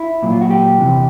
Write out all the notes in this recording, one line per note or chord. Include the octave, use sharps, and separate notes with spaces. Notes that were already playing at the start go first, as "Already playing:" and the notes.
Already playing: E4
A#2 F#3
F4
F#4
G4
E2 C3 E3